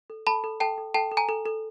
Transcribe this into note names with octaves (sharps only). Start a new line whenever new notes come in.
A4
A4 A5 B5
A4
A4 G5 A5
A4
A4 G5 A5
A4
G#5 A#5
A4
A4